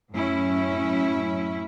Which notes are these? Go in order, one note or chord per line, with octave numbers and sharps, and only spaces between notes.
F#2 A2 C#4 E4